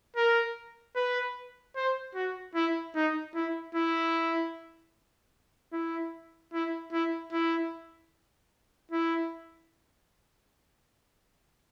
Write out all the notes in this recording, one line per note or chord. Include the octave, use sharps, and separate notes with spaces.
A#4
B4
C5
F#4
E4
D#4
E4
E4
E4
E4
E4
E4
E4